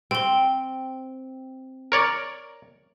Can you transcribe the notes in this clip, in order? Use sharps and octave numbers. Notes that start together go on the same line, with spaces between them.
C4 G5 G7
A#4 C#5 D5